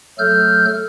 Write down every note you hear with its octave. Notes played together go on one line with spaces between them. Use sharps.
F#3 A3 A4 F6 G6